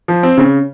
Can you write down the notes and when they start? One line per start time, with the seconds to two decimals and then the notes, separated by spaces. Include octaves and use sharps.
0.08 F3
0.23 C4
0.38 C#3